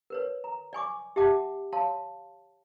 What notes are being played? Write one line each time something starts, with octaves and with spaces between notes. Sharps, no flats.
A#4 B4 C#5
A#5
D5 G#5 C#6 D6
G4 E5 F#5 A5 D6
C#5 F5 A5 C6